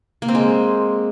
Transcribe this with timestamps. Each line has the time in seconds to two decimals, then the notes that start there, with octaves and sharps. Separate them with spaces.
0.22 A#3
0.28 C4
0.35 G#3